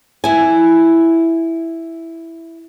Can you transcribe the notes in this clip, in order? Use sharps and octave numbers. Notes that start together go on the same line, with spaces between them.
E4 G#5